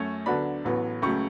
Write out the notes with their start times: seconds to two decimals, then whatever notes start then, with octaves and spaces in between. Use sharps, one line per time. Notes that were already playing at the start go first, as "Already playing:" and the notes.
Already playing: F#2 A3 C#4
0.26 D2 D3 F#3 B3 D4 B5
0.65 A1 A2 F#3 B3
1.02 C#2 C#3 F#3 A3 C#6